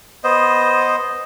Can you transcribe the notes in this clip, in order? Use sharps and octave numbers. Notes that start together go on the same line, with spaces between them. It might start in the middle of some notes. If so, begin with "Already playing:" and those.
B3 C5 D#5